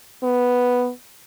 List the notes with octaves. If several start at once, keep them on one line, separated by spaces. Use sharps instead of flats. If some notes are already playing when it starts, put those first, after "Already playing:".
B3